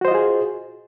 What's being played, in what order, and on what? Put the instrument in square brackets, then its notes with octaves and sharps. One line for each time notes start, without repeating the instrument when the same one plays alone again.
[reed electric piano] F#4
C5
D#5
F4
G#4